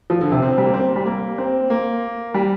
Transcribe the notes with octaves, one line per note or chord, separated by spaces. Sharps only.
F3
D3
C3
C4
G3
A#3
C4
G3
A#3
C4
A#3
G3